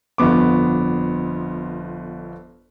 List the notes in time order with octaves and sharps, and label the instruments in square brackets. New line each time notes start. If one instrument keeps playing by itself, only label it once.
[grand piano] G1 F2 B3 D6